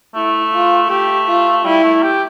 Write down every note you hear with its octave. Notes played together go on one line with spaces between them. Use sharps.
A3 E4
F4
A3 G4
F4
G3 E4
A3
G4